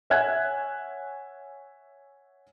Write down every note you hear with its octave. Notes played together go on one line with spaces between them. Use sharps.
C#5 E5 F#5 G#5 F#6 G#6